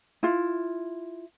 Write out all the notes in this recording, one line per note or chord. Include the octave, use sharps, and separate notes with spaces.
E4 F4